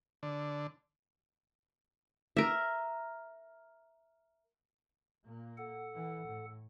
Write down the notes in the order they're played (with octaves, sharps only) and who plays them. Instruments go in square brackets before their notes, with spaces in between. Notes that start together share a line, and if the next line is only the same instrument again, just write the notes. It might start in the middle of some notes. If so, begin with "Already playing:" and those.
[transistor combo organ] D3
[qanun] A#4 E5
[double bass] A#2 A#3
[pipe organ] A4 F#5
[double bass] E3
A2